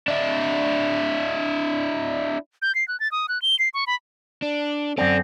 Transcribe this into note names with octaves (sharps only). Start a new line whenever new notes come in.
D4 E4
G6
C7
F#6
A6
D#6
F#6
G7
C7
C#6
B5
D4
F#2 C4 A4 D5